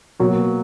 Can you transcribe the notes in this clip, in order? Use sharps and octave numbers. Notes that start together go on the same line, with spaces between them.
B2 F#3 A#3 F#4